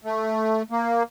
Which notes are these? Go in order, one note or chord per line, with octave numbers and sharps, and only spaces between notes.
A3
A#3